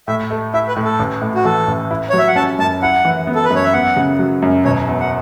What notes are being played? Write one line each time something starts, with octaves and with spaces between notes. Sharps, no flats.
A2 E5
A3
E4 E5
B4
A2
A4
A1
A2
F#4
E3 A4
A1
E4
F#3 C#5
E5
F#5
C#4 A5
F#2 A5
E4 F#5
E3
B3
A4
B4
F#2 C#5
E5
B3 F#5
C#3
F#3
F#2
E1 C#5
E2
F#5